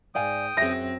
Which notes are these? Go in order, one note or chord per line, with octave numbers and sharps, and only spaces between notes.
G#2 D5 F5 G5 G#5 D#6
F#2 C4 G#4 E5 A#6